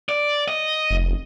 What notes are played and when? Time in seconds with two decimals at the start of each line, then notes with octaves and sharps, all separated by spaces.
0.09 D5
0.48 D#5
0.90 F1